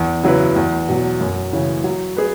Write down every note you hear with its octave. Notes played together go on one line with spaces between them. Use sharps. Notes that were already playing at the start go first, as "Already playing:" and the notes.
Already playing: E2
C#3 F#3 E4 B4
E2
B2 F#3
F#2
C#3 E3 C#4
F#3
G#4 B4